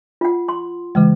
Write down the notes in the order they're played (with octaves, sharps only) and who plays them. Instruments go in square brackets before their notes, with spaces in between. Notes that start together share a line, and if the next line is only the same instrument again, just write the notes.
[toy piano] F4 F#5
C6
[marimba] C#3 E3 G#3